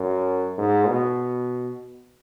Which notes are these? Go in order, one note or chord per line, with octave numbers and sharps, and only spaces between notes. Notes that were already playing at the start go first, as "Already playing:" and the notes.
Already playing: F#2
G#2
B2